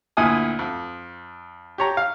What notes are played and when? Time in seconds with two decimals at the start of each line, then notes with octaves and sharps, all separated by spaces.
0.17 D2 A#2 E4 G#5 D#6
0.59 F2
1.78 G4 C#5 A#5
1.97 F5